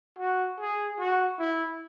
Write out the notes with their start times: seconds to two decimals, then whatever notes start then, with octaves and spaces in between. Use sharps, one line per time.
0.19 F#4
0.59 G#4
0.99 F#4
1.39 E4